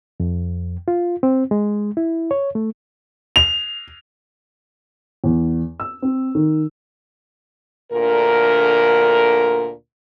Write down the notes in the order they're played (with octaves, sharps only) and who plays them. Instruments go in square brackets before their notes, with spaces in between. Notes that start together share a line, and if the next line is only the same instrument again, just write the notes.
[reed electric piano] F2
F4
C4
G#3
E4
C#5
A3
[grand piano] F7
[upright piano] E2
E6
C4
D#3
[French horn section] D2 A#2 D3 A#4